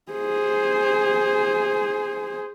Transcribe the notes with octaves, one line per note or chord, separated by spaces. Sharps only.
G#4 C5